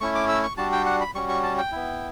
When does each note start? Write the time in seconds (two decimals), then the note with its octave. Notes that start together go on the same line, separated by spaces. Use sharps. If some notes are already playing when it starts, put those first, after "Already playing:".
0.01 A3 C#4 E4 C#6
0.15 D6
0.29 E6
0.43 C#6
0.57 G3 D4 F#4 A5
0.72 G5
0.86 F#5
1.01 B5
1.15 G3 C#4 F#4 C#6
1.29 C#6
1.43 A5
1.58 G5
1.72 B3 E4